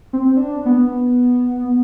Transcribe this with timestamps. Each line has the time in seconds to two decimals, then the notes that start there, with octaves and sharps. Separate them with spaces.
0.13 C4
0.36 D4
0.66 B3